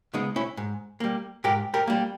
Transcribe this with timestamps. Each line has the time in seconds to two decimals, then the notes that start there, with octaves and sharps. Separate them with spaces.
0.13 C#3 G#3 B3 D#4
0.36 C#4 E4
0.57 G#2
1.00 G3 A#3
1.44 G#2 G4 A#4
1.74 G4 A#4
1.87 G3 A#3